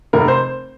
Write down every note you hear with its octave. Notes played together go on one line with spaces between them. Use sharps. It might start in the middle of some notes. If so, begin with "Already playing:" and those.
F1 A#4
C5